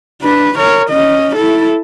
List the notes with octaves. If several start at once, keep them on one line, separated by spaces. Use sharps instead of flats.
D4 B4
A#4 C#5
C#4 D#5
E4 A4